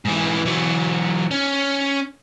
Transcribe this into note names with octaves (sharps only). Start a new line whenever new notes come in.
G#2 E3
E3 F#3
C#4